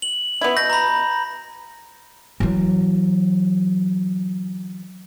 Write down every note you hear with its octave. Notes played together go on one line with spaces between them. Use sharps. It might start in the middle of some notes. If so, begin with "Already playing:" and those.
F#7
B3 E4
B2 G6 A#6
A#5 B5
E3 F#3